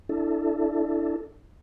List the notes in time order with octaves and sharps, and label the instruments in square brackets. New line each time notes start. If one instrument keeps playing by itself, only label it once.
[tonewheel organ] D4 E4 A4